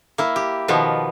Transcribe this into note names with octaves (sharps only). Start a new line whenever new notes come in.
A#3 E4
G4
B2 D#3 F3 B3